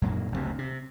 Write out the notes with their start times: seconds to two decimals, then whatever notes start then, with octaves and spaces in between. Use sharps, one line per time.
0.02 F#2 A#2 A#3
0.32 F#1 D2 A2 C3
0.58 C3